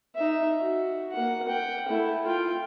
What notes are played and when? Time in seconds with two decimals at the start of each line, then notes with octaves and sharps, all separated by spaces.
0.16 D#4 E5
0.60 F#4
1.12 A#3 F#5
1.48 F#5 G5
1.88 A3 E4
2.26 F4 G5